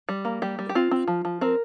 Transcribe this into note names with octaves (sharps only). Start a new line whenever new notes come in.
G3
A#3
G3 G4
G3
G4
C4 F4
C4
F3
F3
C4 A#4